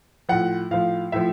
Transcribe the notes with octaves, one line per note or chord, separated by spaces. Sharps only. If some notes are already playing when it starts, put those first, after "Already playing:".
A2 F3 F#5
A2 F3 F5
A2 F3 E5